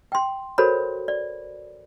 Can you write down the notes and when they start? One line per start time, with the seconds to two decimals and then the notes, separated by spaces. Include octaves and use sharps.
0.12 G5 C6
0.58 F#4 A4 A#4 C5 C#5 B5
1.08 D5